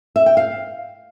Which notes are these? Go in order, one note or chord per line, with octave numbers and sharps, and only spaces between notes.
E5
G5
F5